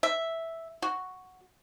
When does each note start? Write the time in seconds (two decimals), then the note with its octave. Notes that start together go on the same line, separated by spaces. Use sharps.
0.03 E5
0.82 F#4